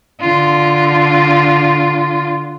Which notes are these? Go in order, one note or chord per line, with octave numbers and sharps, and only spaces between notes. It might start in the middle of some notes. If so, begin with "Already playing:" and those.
D3 F4